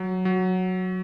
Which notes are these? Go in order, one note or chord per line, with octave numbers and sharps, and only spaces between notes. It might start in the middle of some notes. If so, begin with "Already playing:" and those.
Already playing: F#3
F#3